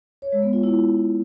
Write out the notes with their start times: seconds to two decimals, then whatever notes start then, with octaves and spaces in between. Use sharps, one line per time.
0.22 C#5
0.32 G#3
0.43 B3
0.53 F4
0.63 E4